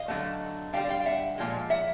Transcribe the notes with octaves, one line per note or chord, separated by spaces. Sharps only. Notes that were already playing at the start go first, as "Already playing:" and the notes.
Already playing: D#5 F5
D3 F#3 A3
D3 G3 F5 G5
F5 G5
E5 F#5
A#2 F3 G#3
E5 F#5